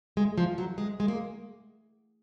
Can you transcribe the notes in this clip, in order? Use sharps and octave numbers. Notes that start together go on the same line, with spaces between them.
G#3
F3
F#3
G#3
G#3
A#3